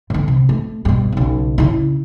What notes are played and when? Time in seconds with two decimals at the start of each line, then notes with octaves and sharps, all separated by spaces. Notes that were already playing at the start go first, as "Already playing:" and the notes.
0.10 D3 D4
0.28 C3
0.49 A3
0.85 G2 B2
1.12 B1 C#3
1.58 C#3 E4